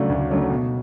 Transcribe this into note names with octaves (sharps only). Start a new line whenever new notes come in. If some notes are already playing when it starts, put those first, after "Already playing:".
Already playing: C#3 F#3 A3 D4
D2
C#3 F#3 A3 D4
B2